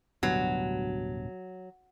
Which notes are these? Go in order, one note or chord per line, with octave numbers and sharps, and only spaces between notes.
D1 G2 B2 F#3